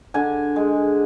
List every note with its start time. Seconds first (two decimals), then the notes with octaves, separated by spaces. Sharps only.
0.14 D3 G#5
0.56 G#3